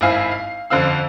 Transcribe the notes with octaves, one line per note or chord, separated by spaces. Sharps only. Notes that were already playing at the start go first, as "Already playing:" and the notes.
G#1 C4 E4 F5 G#5
F5
F2 D3 C4 F5 E6